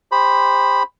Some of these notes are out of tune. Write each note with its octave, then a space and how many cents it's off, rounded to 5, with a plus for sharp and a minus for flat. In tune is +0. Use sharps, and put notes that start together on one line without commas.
G4 +30 C5 +0 B5 +0